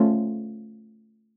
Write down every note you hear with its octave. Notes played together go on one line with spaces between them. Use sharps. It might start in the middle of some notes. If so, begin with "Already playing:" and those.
Already playing: A3 C#4 F4